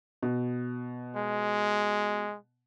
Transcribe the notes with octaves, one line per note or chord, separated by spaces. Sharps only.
B2
G#3